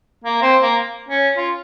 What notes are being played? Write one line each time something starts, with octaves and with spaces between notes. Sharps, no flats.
A#3
C4
A#3
C#4
F4